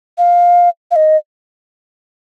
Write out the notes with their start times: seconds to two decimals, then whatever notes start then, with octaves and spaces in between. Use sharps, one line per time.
0.18 F5
0.91 F5
0.96 D#5